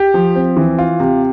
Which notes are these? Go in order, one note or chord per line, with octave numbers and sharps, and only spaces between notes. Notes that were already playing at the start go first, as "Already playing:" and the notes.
Already playing: G4
F3
C4
E3
F4
C3